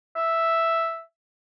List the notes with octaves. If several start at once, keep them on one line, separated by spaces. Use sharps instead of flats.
E5